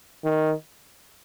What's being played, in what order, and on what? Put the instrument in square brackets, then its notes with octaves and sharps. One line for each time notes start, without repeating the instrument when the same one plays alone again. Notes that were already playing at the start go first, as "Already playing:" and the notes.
[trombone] D#3